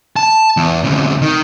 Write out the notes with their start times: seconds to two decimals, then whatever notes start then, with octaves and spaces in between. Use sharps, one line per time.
0.16 A5
0.57 E2
0.84 D2 C3
1.22 D#3